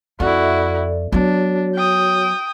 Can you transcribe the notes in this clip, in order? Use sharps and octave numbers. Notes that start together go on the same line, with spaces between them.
F2 E4 F#4 A4 D5 E5
F#3 B3 D4 F#4 C#5
G5 D#6